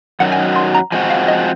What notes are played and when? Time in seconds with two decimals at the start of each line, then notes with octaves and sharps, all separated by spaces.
0.20 F#2 D#3 F#3 F#5
0.32 G#5
0.56 C6
0.75 A#5
0.92 F3 G#3 C4 F#4 G#5
1.10 F5
1.28 D#5